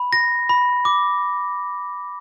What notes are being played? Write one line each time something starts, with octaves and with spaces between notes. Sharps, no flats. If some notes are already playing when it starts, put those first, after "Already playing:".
Already playing: B5
A#6
B5
D6